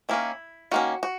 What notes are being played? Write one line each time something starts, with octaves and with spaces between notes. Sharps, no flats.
D#3 A#3 C#4 E4
D#3 A#3 C#4 F#4
F#4